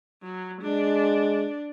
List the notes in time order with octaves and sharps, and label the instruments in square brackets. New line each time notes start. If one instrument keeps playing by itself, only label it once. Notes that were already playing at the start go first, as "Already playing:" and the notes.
[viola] F#3
[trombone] G#3 [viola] D4